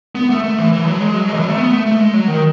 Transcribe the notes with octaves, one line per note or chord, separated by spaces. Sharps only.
B3
A3
A3
E3
E3
F#3
G#3
F#3
G#3
E3
F#3
A3
B3
A3
A3
G#3
F#3
D#3